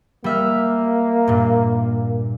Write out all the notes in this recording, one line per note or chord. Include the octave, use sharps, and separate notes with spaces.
G3 A#3 E5 F6
G2 A#2